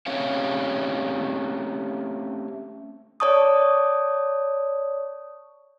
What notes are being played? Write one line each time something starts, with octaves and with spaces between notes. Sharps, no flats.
A3 C4 C#4 G4 C#5 F5
C#5 D5 A5 C#6 D#6